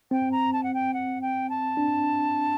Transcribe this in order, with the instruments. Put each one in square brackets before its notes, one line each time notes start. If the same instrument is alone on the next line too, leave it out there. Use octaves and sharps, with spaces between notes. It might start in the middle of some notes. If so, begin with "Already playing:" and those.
[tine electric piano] C4 [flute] G5
[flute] A#5
A5
F#5
G5
F#5
G5
A5
[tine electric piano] D4